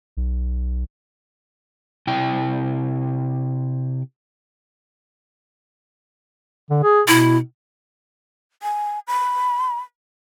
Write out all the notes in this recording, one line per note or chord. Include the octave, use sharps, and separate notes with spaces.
B1
C3 E4 G5
D3
G#4
B2 E4
G#5
B5